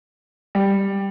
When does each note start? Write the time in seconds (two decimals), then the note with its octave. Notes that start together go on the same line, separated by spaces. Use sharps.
0.55 G3